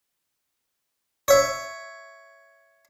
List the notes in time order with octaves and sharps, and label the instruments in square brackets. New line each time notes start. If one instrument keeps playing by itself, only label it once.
[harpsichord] C#5 E5